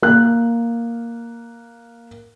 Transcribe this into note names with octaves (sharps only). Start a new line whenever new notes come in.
A#3 F#6